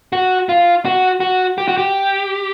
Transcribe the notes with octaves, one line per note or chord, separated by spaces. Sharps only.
F#4
F4
F#4
F#4
G4
F#4
G4